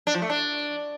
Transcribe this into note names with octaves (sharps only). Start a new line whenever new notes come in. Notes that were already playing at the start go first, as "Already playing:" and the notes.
D4
F3
A3
D4